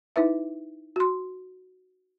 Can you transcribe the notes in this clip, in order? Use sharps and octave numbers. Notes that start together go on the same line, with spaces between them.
D#4 E4 B4 E5
F#4 C6